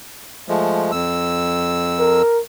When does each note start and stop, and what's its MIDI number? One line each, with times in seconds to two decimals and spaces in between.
0.48 0.92 53
0.48 0.92 56
0.48 0.92 57
0.92 2.22 41
0.92 2.22 88
2.00 2.39 70